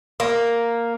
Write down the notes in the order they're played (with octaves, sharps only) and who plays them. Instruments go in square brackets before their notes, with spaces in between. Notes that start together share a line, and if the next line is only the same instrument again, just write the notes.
[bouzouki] A#3